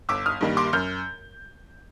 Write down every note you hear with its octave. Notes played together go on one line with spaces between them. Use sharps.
G1 D6 E6
D#6 F6
G2 D#3 G3 A#3
C6 D6
F#2 F6 G6